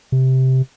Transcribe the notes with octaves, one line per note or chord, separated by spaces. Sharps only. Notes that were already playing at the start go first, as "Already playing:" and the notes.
C3